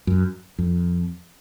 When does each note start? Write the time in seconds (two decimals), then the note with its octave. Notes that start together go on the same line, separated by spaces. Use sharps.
0.07 F#2
0.59 F2